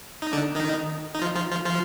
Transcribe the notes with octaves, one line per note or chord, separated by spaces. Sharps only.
D#4
D3 D4
D#3 D#4
D#4
F3 F4
F3 F4
F3 F4
F3 F4